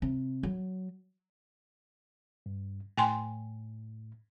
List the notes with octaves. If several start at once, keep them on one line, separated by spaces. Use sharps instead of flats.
C3
F#3
G2
A2 G5 G#5 C6